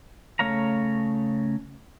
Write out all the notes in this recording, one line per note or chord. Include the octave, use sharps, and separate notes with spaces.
C#3 A3 C#5 F5 A#5